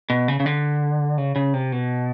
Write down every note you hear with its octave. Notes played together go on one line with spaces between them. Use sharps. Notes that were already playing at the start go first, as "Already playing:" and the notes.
B2
C#3
C#3
D3
C#3
C#3
C3
B2